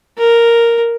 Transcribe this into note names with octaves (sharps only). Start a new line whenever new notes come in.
A#4